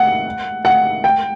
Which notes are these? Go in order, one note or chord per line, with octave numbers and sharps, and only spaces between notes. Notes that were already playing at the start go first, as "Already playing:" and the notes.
Already playing: F#5
F#5
G5